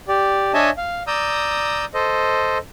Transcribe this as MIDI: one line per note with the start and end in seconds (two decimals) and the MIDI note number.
0.08 0.53 67
0.08 0.53 74
0.54 0.70 62
0.54 0.70 73
0.54 0.70 75
0.54 0.70 76
0.54 0.70 80
0.54 0.70 81
0.77 1.03 77
1.07 1.85 74
1.07 1.85 82
1.07 1.85 87
1.07 1.85 88
1.07 1.85 91
1.94 2.58 69
1.94 2.58 72
1.94 2.58 75